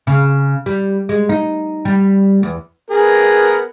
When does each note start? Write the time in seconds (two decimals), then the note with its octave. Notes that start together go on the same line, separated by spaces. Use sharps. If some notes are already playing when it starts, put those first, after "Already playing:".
0.07 C#3
0.66 G3
1.09 G#3
1.29 D#4
1.85 G3
2.43 E2
2.91 B3 G#4 A#4